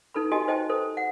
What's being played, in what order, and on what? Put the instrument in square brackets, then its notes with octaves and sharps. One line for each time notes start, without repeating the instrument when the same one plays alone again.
[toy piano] D#4 A4 B4 B5
F#4 G4 A4 D#5 G#5 A5
C5 D#5 G5 A5
A4 C5
F#5